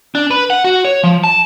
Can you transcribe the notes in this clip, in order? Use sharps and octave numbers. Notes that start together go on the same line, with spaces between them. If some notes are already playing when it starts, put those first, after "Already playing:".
D4
B4
F#5
F#4
C#5
F3
A5